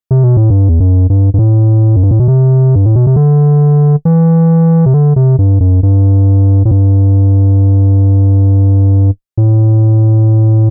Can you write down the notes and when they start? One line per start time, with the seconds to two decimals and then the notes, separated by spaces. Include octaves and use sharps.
0.11 C3
0.24 B2
0.37 A2
0.50 G2
0.68 E2
0.80 F#2
1.10 G2
1.34 G2
1.39 A2
1.96 F#2
2.03 G2
2.11 A2
2.20 B2
2.28 C3
2.75 G2
2.85 A2
2.96 B2
3.07 C3
3.16 D3
4.05 E3
4.86 C3
4.94 D3
5.16 C3
5.39 G2
5.60 F#2
5.83 G2
6.65 A2
6.71 G2
9.38 A2